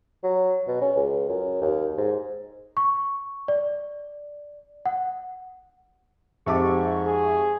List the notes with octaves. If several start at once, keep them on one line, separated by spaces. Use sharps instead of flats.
F#3
B2
C#4
C#2
F#2
D#2
G#2
C#6
D5
F#5
F2 G#2 G4 E5 A5 C#6 D6
G#4